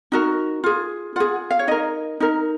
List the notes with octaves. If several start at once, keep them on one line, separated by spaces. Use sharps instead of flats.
D#4 F#4 A#4
F4 G#4
F4 G#4 F#5
F5
C#5
D#4 A#4 D#5
D#4 A#4